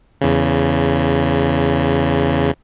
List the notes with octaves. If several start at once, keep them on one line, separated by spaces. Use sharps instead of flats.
E2 C#3